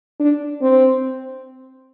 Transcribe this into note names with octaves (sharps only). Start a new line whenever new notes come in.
D4
C4